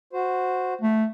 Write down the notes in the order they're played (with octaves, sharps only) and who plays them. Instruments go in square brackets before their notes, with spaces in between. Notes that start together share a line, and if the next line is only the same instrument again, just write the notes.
[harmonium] F#4 C5
[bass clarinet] A3